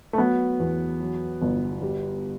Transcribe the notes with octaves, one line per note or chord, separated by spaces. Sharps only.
A3
F#3 B3
E2
F#3
G1
G3